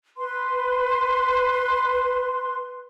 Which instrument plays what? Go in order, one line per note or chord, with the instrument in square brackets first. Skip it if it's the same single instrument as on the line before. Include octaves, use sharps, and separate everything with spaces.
[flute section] B4 C6